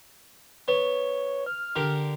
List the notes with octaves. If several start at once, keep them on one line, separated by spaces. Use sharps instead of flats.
B3 C#5
F6
D3 G4 A#4